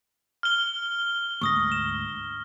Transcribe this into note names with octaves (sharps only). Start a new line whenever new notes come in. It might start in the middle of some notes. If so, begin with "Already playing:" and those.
F6 G7
D2 G#2 C#6 D#6 A#6
E7